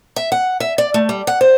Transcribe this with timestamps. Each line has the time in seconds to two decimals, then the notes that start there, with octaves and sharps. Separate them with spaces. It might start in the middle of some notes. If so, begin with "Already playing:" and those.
0.16 E5
0.32 F#5
0.60 E5
0.78 D5
0.94 A3
1.09 G3
1.27 F#5
1.41 C5